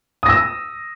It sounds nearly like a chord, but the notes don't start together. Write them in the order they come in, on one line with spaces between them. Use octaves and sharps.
D#6 A#6 E6